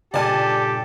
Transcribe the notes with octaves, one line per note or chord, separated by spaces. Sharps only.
G2 A#2 C#3 G4 A4 D5 G#5 A5